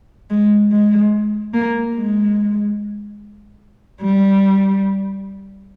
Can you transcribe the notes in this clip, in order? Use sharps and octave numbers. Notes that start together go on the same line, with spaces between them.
G#3
G#3
A#3
G#3
G3